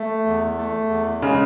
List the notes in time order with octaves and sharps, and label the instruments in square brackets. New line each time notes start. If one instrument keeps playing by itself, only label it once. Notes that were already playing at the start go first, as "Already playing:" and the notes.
Already playing: [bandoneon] A3
E2
A3
E2
[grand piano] C#3 [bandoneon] G#3